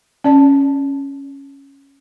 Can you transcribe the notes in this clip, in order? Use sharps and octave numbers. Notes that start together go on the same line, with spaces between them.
C#4 D5 A5